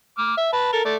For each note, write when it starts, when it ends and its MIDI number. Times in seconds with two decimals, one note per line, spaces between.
0.18 0.36 86
0.18 0.36 89
0.38 0.52 76
0.53 0.70 71
0.53 0.70 81
0.72 0.80 69
0.72 0.80 70
0.85 0.96 57
0.85 0.96 74